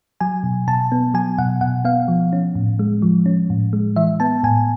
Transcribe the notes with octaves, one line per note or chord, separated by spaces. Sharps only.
F#3 G#5
B2
B2 A5
B3
F#3 G#5
B2 F#5
B2 F#5
B3 F5
F3
C#4
A2
G#3
F3
C#4
A2
G#3
E3 E5
B3 A5
A2 G#5